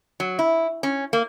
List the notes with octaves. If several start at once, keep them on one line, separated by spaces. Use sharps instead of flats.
F#3
E4
C#4
A#3